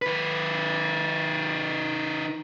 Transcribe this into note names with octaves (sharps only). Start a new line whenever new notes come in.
D#3 B4